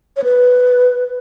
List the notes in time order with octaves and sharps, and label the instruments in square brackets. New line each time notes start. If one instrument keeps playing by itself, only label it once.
[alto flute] C#5
B4